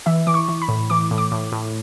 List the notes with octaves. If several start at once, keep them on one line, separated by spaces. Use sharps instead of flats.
E3 E5
E3 D6
C#6
E3
B5
A2
E3 D6
A2
D6
A2
A2